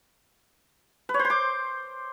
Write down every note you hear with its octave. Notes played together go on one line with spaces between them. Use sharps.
B4
C#5
C5
C6
D6